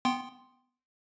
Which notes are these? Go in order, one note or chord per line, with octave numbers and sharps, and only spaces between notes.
B3 G5 C6